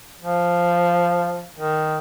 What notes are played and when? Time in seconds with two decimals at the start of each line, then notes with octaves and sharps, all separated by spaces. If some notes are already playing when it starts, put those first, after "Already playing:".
0.22 F3
1.55 D#3